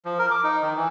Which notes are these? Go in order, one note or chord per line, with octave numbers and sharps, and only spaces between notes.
F3
A#4
D6
D#4
D#3
E3